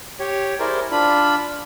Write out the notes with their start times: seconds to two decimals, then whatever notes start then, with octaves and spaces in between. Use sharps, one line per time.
0.20 G4 C#5
0.60 E4 G#4 A#4 C5 D5
0.91 D4 F4 B5